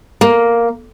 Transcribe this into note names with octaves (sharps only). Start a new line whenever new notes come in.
A#3